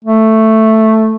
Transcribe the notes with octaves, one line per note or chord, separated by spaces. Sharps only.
A3